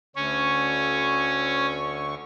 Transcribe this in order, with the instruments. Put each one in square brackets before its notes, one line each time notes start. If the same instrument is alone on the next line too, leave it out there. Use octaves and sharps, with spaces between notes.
[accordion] D2 D3 C#6 [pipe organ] C#4